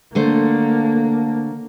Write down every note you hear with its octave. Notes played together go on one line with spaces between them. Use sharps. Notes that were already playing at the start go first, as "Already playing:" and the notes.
D3 A3 A#3 C5